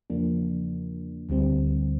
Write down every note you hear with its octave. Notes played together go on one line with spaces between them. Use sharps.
E2 C#3 F3 A#3 D4
D2 D3 G3 C4